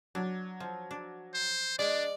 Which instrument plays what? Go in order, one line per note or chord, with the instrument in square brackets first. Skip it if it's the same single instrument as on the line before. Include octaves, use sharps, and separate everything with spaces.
[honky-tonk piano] F#3 [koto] D4
[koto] F3
D4
[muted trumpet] C5
[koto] G#3 [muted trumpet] D4 [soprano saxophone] D5